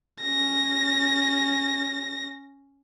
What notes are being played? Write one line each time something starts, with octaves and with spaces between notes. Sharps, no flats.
C#4 A#6